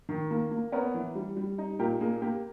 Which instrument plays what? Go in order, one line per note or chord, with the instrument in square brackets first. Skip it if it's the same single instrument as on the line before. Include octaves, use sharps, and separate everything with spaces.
[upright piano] D#3
A#3
A#3
B3 A#4 C#5
E3
G3
G3
D#4
A#2 G4 A#4
A#3 G#4
A#3 G4